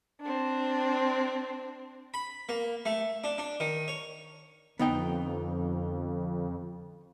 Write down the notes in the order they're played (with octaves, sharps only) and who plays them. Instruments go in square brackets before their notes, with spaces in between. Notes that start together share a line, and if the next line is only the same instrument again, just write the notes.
[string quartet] C4 D4
[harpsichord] B5
A#3
A3
D4
D4
D#3
C#5
[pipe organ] F2 [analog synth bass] D3 [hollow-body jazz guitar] B3 D#4 G5